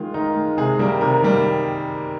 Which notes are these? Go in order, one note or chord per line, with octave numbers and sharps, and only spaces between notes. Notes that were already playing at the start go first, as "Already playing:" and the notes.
Already playing: D#3 G#3 F4
D#3 D#4
G#3
C3 G#4
D#3 G3 A#3
C3 A#4
D#3 G3 A#3